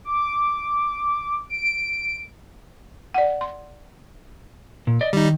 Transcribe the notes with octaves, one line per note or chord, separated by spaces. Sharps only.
D6
D7
D5 F#5
C6
A#2
D5 D#5
D#3 G3 D#4